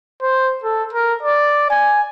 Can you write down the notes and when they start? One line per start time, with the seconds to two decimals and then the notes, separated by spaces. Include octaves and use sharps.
0.22 C5
0.64 A4
0.93 A#4
1.23 D5
1.70 G#5